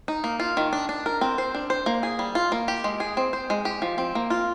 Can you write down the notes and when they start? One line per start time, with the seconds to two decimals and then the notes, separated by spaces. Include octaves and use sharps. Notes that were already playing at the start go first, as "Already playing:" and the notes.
0.08 D#4
0.24 A#3
0.40 F4
0.57 D#3
0.73 D4
0.89 D4
1.06 A#4
1.21 C4
1.38 C5
1.55 D4
1.70 C5
1.86 A#3
2.03 G#4
2.19 G3
2.35 F4
2.52 A#3
2.68 G4
2.84 G#3
3.00 G#4
3.17 C4
3.33 C5
3.50 G#3
3.65 G4
3.82 F3
3.98 C4
4.15 A#3
4.30 F4